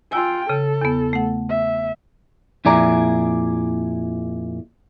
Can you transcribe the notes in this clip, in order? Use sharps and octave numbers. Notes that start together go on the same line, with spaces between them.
F4 G5 G#5 E6
C#3 A4
E2 B3
A3 F#5
E5
F2 A#2 E4 G#4 D5 A#5